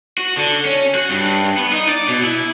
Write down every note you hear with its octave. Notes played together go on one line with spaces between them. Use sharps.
F#4
D3
C#4
F#4
G2
B3
D#4
D5
B2
E4